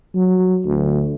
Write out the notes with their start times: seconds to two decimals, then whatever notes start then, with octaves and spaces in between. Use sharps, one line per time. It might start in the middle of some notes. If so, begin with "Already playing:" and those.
0.15 F#3
0.66 D2